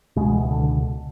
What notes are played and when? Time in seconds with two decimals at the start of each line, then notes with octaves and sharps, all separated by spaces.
0.16 C#2 B2 G#3
0.33 E3
0.51 D3